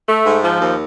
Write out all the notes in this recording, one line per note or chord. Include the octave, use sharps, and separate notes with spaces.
A3
G#2
F3
D#2